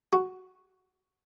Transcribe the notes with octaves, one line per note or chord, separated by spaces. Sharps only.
F#4